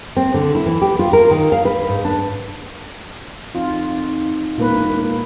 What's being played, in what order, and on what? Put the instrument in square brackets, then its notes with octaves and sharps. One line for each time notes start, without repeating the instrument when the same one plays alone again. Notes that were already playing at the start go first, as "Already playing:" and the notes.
[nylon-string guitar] C4
D3
E4
E3
G4
F4
A#4
D#3
F5
B4
G#2
D4
[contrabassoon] F2 [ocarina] D#4 [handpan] F4
[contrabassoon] E1 [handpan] A#2 A#3 B4